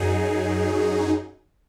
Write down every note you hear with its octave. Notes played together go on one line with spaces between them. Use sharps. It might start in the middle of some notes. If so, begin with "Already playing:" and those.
Already playing: F#2 F#3 D#4 G#4